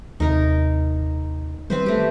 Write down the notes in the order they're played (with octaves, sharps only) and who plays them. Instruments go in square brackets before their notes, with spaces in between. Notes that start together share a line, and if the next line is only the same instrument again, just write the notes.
[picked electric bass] D#2 C3 [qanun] D#4 A#4
[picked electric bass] D#3 G3 B3 [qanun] C4 B4 C5
[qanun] A3 G4